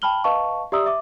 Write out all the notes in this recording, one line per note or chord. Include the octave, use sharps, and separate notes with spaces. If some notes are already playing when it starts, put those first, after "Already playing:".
G5 A5 B5 F6 F#7 G7
B4 D#5 F5 A5 C#6
G4 D5 E5 A#5 D#6 E6
E5 D6